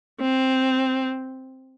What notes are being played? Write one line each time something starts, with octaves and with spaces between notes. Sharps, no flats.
C4